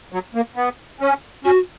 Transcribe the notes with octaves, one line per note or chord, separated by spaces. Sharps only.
F#3
A#3
B3
C#4
C#4 F#4